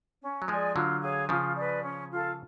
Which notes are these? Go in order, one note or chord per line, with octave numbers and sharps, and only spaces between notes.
C#4
F#3
F3 G#3 G#4 D5 G#5
D3 F#3 F4
G#4 C#5 F5
C#3 F3 F4
B4 D5
C#4
F4 A4 F5